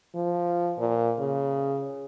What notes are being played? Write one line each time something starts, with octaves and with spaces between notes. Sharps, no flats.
F3
A#2
C#3